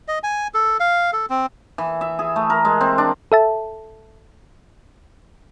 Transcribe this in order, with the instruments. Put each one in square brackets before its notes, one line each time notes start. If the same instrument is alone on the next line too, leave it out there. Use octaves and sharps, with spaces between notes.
[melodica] D#5
G#5
A4
F5
A4
C4
[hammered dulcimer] E3
E5
G#4
A3
A#4
G#3
C4
D4
[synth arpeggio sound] A4 E5 A5